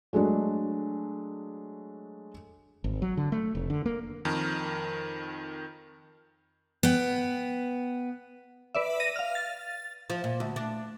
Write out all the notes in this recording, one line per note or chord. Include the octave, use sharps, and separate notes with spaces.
F#3 G#3 A3 D4
G#1
F#3
D3
A3
F1
D3
A#3
F2 D#3 A#4
B3 G5
B4 D5 E5
A#6 D#7
F5 F6
A6
F3
A#2
D2
D4